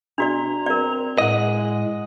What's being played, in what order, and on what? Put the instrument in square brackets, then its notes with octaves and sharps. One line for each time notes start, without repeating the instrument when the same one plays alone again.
[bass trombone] B2 [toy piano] D4 F#4 D5 [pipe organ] A#5
[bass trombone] C4 [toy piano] A#4 D5
[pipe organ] A2 [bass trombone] G#3 [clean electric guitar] D#5 F#5